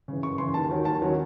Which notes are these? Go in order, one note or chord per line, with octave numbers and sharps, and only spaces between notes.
C#3 E3
F#2 C#6
C#3 E3 C6
D#2 A5
D#3 F#3 C#4
D#2 A5
D#3 F#3 C#4